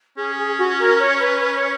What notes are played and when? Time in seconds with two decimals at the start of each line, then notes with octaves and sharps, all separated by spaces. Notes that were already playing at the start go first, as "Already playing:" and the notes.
0.17 C#4 G#4
0.37 G#4
0.58 F#4
0.79 A#4
0.99 C#5
1.19 B4
1.39 B4
1.55 C#5